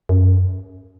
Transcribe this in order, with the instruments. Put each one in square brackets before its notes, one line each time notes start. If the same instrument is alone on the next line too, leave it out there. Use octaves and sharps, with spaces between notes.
[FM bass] F#2